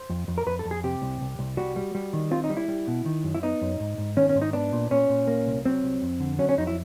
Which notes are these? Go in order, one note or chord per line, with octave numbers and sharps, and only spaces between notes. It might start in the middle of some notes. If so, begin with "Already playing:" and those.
Already playing: C5
F2
F2
A#4
F2 B4
A4
F2
G#4
C3 G4
C2
C2
C2
G3 F#4
G3
G3
D#3
C4 F4
D#4
G3
E4
G3
B2
D#3
F#2
E4
B3 D#4
F#2
G#2
G#2
D#3 C#4
C#4
G#2
D#4
B3 D4
A#2
A#2 C#4
A#2
A#3
C2
F#3 C4
C2
F2
D3
F#3 C#4
C#4
F2 D#4
E4